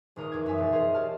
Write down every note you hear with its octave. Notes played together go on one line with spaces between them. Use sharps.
D#1 G#1 A#4 C#6 D#6
E2 D6 G#6
F#2 D#4 E5 G#5
E1 A#2 A6
F4 G#4 A#4 C5 D#5
G4 C#5 A5 F6